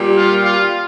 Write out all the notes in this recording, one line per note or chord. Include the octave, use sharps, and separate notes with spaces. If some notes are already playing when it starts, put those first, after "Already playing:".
Already playing: A#2 G3
F4
F4